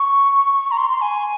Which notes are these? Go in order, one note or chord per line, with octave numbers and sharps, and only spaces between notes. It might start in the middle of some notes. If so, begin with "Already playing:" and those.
Already playing: C#6
A#5
C6
C6
G#5